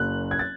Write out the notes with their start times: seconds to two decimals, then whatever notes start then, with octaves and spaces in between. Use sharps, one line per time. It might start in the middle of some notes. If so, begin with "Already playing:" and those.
Already playing: F#1 F#2 F#6
0.31 G#6
0.39 A6